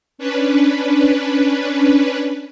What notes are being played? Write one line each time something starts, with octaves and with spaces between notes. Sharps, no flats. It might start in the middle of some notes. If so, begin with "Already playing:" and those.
C#4 D4 B4